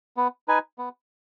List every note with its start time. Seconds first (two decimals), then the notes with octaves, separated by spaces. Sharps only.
0.17 B3
0.48 D#4 B4 G#5
0.78 B3